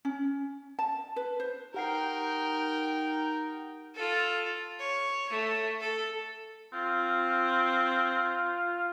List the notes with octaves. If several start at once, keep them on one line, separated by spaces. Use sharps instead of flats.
C#4
A5
B4
C5
D#4 G4 A#4 F#5 G5 C7
F4 A4
C#5
A3
A4
C4 F4